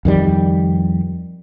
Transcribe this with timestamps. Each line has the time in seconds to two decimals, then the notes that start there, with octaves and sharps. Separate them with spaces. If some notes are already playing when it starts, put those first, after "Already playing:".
0.05 F2 D#3 G3